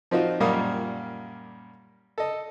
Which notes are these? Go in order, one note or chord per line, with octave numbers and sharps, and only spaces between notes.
F3 C4 D#4 F4 F#4
F#2 A#2 G3 A#3 F5 D#6
A4 D#5